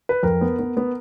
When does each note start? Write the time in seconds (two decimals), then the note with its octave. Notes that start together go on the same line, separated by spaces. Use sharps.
0.09 B4
0.23 F2 A#4
0.41 B3
0.59 B3
0.77 B3